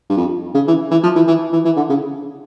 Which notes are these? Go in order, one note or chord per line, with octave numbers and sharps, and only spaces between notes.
G2
F2
C#3
E3
E3
F3
E3
E3
E3
E3
D3
C#3